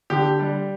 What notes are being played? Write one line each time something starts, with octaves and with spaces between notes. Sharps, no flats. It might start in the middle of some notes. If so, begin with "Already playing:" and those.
D3 G4
G3